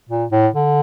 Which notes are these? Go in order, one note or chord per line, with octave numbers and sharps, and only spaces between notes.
A#2
A2
D3